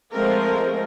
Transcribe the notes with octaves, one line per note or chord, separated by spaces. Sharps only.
F3 G#3 A3 C4 A#4